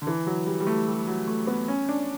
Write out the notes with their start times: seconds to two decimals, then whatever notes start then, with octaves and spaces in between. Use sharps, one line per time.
0.02 D3
0.07 E3
0.26 F#3
0.46 G3
0.60 G3
0.67 A3
0.88 G3
1.07 F#3
1.28 A3
1.47 B3
1.68 C#4
1.89 D4